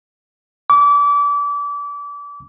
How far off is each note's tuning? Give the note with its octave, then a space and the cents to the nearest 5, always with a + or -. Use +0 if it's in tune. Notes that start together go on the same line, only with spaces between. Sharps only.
D6 -30